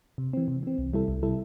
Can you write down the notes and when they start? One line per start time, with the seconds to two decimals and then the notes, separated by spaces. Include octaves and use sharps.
0.18 C3
0.33 E3 C4
0.48 C3
0.63 E3 C4
0.78 C2
0.93 C3 G3 E4 A4
1.08 C2
1.23 C3 G3 E4 A4